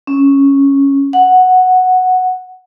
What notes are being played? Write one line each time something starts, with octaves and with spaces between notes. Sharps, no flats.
C#4
F#5